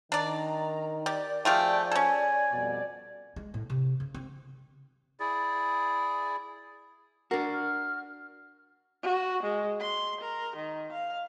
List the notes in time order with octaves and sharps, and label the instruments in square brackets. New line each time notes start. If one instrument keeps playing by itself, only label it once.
[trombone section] D#3 [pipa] D4 D5 [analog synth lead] A#5
[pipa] G4 [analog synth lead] D5
[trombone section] F3 G#4 [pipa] A3 F4 G4 [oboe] G5
[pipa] C#4 A4 [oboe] G#5
[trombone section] F2 B2 G3
[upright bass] G#3
A2
C3
C#3
C4
[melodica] E4 G#4 D5
[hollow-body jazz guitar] D4 F#4 [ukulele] A#4 [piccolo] C7
[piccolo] F6
[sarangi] F#4
G#3
C6
A#4
D#3
F5